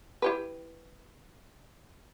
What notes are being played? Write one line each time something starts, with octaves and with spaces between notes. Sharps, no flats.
E4 G4 B4